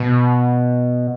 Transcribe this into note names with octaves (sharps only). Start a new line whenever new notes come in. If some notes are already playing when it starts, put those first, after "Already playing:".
Already playing: B2